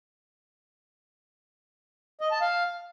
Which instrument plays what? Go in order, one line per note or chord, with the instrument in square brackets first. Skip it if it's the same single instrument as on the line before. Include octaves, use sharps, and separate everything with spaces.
[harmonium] D#5
A5
F5